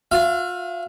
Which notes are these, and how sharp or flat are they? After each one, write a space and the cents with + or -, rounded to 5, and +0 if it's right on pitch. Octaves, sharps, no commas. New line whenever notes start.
F4 +40 F5 -45